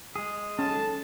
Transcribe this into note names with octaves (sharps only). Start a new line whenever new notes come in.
G#3 G#4
D#3 C#4 F#4 A4 A5